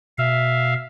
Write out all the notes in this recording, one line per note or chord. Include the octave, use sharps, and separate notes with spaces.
B2 E5 F5